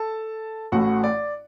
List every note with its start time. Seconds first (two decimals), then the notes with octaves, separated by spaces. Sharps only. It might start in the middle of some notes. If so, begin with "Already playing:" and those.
Already playing: A4 A5
0.72 A1 A2 A3 F#4 F#5
1.04 D5